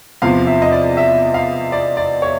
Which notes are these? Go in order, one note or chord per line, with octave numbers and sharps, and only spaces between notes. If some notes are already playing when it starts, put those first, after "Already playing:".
E2 C3 F3 F5
E5
D#5
D5
E5
F5
D5
D5
C#5